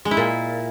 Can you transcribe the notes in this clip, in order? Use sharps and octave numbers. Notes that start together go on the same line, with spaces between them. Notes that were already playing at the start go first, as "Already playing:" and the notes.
G#3
E4
A#2